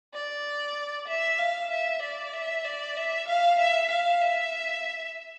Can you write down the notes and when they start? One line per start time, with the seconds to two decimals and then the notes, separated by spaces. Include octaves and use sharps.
0.14 D5
1.08 E5
1.39 F5
1.71 E5
2.02 D5
2.33 E5
2.65 D5
2.96 E5
3.28 F5
3.59 E5
3.91 F5
4.21 E5